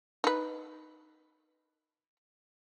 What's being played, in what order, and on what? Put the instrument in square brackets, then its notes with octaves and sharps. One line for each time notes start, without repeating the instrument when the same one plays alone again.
[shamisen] D#4 B4